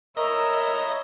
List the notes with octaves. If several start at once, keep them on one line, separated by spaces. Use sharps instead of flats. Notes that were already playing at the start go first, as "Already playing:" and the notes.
A#4 C#5 D#5 E5 B5 E6